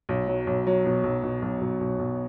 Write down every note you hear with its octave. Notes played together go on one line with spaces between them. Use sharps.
B1
F#3
B1
F#3
B2
B1
B2
B1
B1
B1
B1